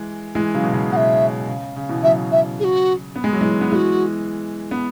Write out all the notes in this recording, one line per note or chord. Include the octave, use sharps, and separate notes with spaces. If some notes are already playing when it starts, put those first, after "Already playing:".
Already playing: E3 G#3
E3 G#3
C#3 F#3
B2
C#3
B2 E5 F#5
C#3
C#3
B2 E3
C#3 F#3 E5
E5
G#4
F#4
B3
G#3
F#3
E3 G#3
B3
E3 G#3 F#4 G#4
B3